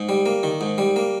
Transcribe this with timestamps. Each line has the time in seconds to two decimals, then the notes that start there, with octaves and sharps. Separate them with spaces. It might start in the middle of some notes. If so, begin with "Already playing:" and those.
Already playing: G#2
0.09 G3
0.26 A#3
0.43 D#3
0.61 G#2
0.78 G3
0.96 A#3